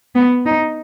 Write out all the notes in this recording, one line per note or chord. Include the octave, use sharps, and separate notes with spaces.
B3
D#4